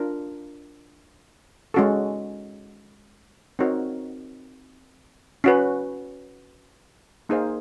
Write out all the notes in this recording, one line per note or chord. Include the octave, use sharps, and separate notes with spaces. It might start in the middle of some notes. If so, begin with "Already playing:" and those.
Already playing: D4 F4 A#4
G#3 C#4 F#4 A4
C4 D#4 F#4 A#4 C#5
C#4 F#4 B4
A#3 D#4 G#4 C5 F5